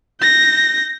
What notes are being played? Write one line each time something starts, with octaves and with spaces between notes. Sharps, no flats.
G6 A#6